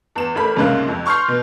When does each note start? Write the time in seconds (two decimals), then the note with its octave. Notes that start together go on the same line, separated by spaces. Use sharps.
0.15 E2 E7
0.35 A1 A4 A#4 B5 B6
0.56 C2 G#2 C#3 A#3 F#6
0.88 F2
1.06 C6 C#6 F6 G6 C7
1.28 B2